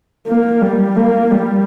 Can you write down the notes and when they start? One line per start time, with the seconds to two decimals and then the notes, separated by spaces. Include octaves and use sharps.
0.28 A#3
0.62 G3
0.96 A#3
1.31 G3